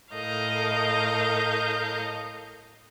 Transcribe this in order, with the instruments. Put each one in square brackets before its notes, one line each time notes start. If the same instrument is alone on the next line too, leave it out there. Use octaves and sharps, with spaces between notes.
[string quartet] A2 A4 A#4 D#5 F5 G6